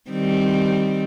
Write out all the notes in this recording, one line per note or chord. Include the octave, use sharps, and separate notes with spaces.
D#3 G3 C4